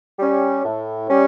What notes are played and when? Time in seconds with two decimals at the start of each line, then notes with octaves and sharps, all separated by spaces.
0.19 G3 C#4
0.65 A2
1.09 G3 C#4